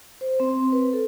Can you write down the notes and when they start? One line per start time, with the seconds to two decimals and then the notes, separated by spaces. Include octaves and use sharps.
0.21 C5
0.40 C4
0.72 B4
0.93 A4